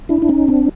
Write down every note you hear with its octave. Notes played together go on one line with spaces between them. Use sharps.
D4 E4
D4
C#4 D#4
C4 D4